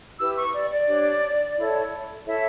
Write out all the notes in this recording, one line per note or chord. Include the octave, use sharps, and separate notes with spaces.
E4 G4 B4 E6
C#6
D5
D5
D4 G4 C#5
E4 A4 C#5
E4 A4 C#5 E5